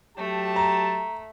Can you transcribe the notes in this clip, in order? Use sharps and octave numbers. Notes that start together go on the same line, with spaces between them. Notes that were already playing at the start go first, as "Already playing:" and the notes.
F#3 A3 G4 A5
A#5